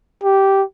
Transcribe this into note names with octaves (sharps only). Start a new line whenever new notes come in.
G4